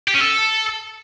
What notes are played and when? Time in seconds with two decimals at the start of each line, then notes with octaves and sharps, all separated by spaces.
0.08 G4
0.14 C#4
0.20 A4